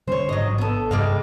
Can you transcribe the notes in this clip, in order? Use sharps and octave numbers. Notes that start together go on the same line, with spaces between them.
D3 G3 C#4 C5 C#5
A1 G#2 F#3 D4 D#5
B3 A4
G2 C3 G3 G#3 F5